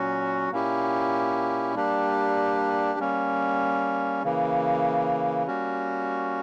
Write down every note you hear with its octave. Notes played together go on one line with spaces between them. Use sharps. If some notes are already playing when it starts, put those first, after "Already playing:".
Already playing: A#2 F#3 C#4 F#4
A#2 A#3 C#4 E4 G4
G3 A#3 D4 G4
G3 A#3 C#4
C#3 E3 A#3
G3 A#3 C#4 F#4